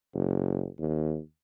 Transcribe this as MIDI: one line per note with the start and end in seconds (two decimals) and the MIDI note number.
0.14 0.67 30
0.79 1.19 39